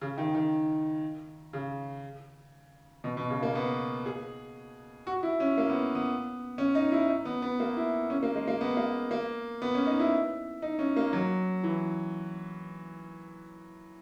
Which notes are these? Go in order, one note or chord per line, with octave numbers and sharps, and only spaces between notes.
C#3
D#3
D#3
C#3
B2
B2
C#3
A#3
B3
G#4
F#4
E4
C#4
A#3
B3
B3
C#4
D#4
E4
D#4
B3
B3
A#3
E4
C#4
A#3
G#3
A#3
B3
A#3
A#3
B3
C#4
D#4
E4
D#4
C#4
A#3
F#3
E3